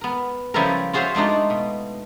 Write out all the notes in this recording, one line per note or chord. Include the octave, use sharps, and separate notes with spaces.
B3 A#4
C#3 F3 G3 E4 A4 A#4
F4 F#4 G#4 C5 C#5 E5
G#3 A3 D4 D#4 F4
B2